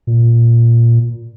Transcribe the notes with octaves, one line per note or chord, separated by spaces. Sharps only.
A#2